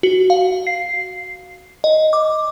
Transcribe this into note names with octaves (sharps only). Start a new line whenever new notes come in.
F#4
F5
C7
D#5
D6